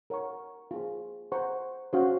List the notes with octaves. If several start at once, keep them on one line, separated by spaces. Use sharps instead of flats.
A#4 C#5 F#5 C#6
F4 G#4 C5
C5 F#5 A#5 C#6
C#4 F#4 C5 F5